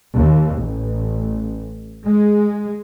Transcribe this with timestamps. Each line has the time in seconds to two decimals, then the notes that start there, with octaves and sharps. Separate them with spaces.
0.16 D#2
0.59 A1
2.06 G#3